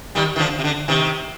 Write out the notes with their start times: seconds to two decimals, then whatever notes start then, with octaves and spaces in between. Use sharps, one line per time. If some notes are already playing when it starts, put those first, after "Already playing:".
0.15 D#3 G3
0.36 D#3
0.39 D3 F3
0.59 C3
0.64 D3
0.88 C3 D#3